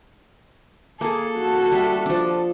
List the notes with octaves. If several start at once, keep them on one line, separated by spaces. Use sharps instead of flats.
A#3 G#4 A4
F#4
G3 E5
F3 D4